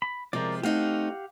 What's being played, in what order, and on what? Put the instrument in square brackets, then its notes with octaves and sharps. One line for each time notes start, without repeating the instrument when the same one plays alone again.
[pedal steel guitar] B5
[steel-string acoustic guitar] C3 F3 G#3 [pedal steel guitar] A#4 D5
[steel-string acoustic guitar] A3 C4 D#4 [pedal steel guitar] G4 F5 F#5